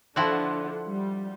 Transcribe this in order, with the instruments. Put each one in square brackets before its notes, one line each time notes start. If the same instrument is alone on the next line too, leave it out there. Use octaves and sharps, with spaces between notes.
[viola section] D3 D4 [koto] F3 E4 F#4 [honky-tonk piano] F#5 C6 F#6
[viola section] G3